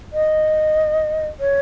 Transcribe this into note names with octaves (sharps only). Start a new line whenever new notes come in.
D#5
C#5